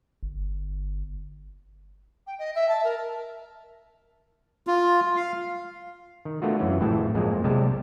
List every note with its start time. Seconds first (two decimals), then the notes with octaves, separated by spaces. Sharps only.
0.23 G1
2.26 G5
2.38 D#5
2.55 E5
2.68 A5
2.84 A#4
4.67 F4
5.16 F5
6.25 D#3
6.42 A3 B3 D4 F4 F#4
6.59 F#2 E3 C#4
6.81 G#1 F2 A2 E3 G5 A5
7.14 F2 A#2 G#3 A#3 C4
7.44 B1 C3 G3 G#3 G4 A5